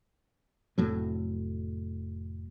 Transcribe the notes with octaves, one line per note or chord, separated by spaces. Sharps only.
F1 A2 F#3